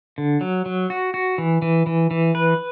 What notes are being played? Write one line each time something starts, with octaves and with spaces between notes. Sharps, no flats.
D3
F#3
F#3
F#4
F#4
E3
E3
E3
E3
B4